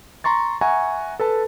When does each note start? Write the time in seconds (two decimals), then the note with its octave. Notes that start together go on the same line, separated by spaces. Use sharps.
0.24 A#5 C6 C#6 A6
0.61 E5 F#5 G#5 A#5 C#6
1.20 A4 B4 A5